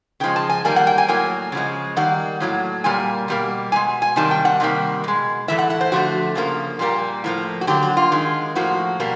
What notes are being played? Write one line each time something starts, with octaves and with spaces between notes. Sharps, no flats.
C#3 F3 G#3 G5
A5
G#5
D#3 G3 A#3 G#5
F#5
G5
G#5
A2 F#3 A#3 G#5
C#3 F3 G#3
D#3 G3 A#3 F#5
A2 F#3 A#3
A#2 G3 A#3 G#5
B2 G3 A#3
B2 G#3 G#5
G#5
C3 D#3 G3 A#3 A5
G5
F#5
C3 D#3 G3 A#3
B2 G#3
A2 E3 A3 E5
F#5
F#5
C5
D3 F3 A3 F#4
C#3 F3 A#3
A#2 G3 A#3
A2 F3 A#3
F#4
D3 F#3 A#3 G4
F#4
F4
D#3 G#3
A2 F3 A#3 F#4
B2 G3 A#3